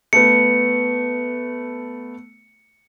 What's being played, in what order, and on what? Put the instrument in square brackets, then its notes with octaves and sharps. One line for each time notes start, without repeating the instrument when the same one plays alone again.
[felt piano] A3 B3 [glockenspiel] C#7